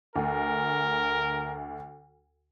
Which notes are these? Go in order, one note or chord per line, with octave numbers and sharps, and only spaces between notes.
D2 A#4